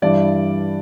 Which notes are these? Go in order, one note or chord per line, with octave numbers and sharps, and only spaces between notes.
G2 E3 G3 D5